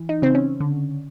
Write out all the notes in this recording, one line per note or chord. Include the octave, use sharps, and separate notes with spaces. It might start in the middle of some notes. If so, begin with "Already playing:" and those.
Already playing: E3
D#4
C#3 C4
C#4
D3